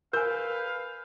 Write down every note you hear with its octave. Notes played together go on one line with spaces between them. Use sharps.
A#4 B4 F5 G#5 G6